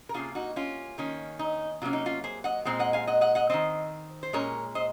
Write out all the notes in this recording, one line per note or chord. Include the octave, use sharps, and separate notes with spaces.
A#4
C3 F3 A#3 C#4 F4 G#4
D#4 F#4
C#4 F4
D#3 A#3 C#4
D#4
C3 F#3 A#3 C#4 F4
D#4
C#4 F4
G#4 C5
D#5 F#5
A#2 G#3 C4
D#5 F#5
F5 G#5
D#5 F#5
D#5 F#5
D#5 F#5
D#3 G#3 C4 C5 D#5
C5
A#2 G#3 C#4 A#4 C#5
C5 D#5